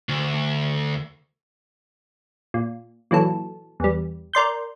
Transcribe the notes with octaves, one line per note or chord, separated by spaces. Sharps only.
D2
A#2
A#2 E3 F#3 A4
E2 G3
A#4 D5 C6 G6